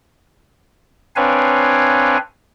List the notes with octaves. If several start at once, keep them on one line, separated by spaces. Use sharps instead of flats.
C4 D4 B4 C#5 F5 G#5